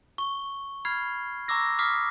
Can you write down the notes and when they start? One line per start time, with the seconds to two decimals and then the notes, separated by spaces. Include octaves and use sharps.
0.18 C#6 G7
0.85 B5 F6 G#6 C7
1.48 A#5 C#6 D6 E6 A#6
1.79 D6 D#6 F6 B6 C7